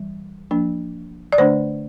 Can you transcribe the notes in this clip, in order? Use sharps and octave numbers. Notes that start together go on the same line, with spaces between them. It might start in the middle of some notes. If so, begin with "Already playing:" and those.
Already playing: E3 G3
F3 A#3 D4
D5
D3 A3 D4 C5